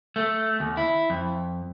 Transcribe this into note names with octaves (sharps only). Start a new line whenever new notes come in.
A3
D#2
E4
F2